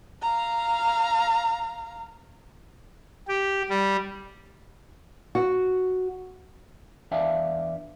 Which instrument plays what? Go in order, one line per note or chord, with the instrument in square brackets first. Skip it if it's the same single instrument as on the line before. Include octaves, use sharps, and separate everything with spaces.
[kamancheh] F5 A#5
[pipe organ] G4
G3
[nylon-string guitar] F#4
[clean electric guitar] E2 D4 D5 E5 F5 A5